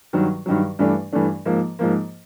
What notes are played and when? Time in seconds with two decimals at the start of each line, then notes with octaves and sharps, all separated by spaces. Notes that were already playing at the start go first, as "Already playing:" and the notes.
0.13 G2 D#3 F#3
0.46 G2 D#3 F#3
0.79 G2 E3 A3 D4
1.13 G2 E3 A3 D4
1.45 G#2 F3 A#3
1.79 G#2 F3 A#3